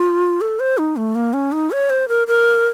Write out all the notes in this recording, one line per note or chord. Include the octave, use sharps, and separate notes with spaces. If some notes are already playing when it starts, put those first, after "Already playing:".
Already playing: F4
A4
C5
D#4
A3
A#3
C#4
D#4
C#5
C5
A#4
A#4